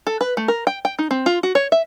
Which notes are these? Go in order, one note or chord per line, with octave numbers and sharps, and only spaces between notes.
A4
B4
A3
A#4
G5
G5
D#4
C4
F4
F#4
C#5
E5